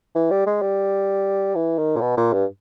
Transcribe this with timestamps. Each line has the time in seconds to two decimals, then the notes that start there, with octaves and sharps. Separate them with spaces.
0.15 E3
0.31 G3
0.46 G#3
0.62 G3
1.55 E3
1.79 D#3
1.97 A#2
2.01 B2
2.17 A#2
2.33 G2